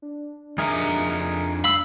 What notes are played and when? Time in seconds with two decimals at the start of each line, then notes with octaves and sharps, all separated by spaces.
0.02 D4
0.58 F2 D#4 G#4 A#4 E5 A#5
1.64 F5 B5 E6